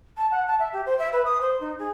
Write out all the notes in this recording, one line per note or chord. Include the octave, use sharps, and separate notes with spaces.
A5
F#5
A5
E5
G4
C5
E5
B4
D#6
C5
D#4
G#4